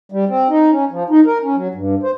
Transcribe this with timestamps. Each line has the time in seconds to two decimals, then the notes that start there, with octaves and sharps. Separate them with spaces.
0.12 G3
0.29 C4
0.49 D#4
0.71 C#4
0.91 F3
1.10 D#4
1.26 A#4
1.43 C#4
1.56 F#3
1.75 G2
2.03 C5